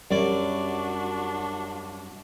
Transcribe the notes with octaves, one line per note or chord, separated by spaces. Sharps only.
F#2 G3 D4 F#4 D5